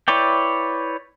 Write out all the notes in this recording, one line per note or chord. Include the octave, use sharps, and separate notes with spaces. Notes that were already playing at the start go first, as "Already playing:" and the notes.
E4 B4 C#5 D5 G5